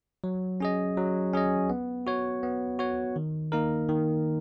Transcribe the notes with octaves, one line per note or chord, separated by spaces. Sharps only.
F#3
C#4 G#4 D#5
F#3
C#4 G#4 D#5
B3
F#4 C#5
B3
F#4 C#5
D#3
A#3 D#4 A#4
D#3